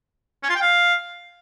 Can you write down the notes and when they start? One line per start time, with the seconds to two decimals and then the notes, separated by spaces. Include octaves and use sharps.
0.43 C#4
0.49 F4
0.55 G5
0.61 F5